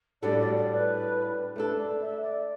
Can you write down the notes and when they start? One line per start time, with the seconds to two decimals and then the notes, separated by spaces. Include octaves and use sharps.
0.22 A2 G3 D4 F#4 A4 D5
0.39 D5
0.56 D5
0.73 B4
1.56 A3 D4 A4 B4
1.77 D5
2.00 E5
2.22 D5